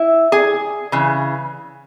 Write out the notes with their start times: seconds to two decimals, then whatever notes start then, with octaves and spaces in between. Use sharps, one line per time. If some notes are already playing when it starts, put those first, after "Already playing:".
Already playing: E4 E5
0.32 G#4 G#5
0.92 C#3 E3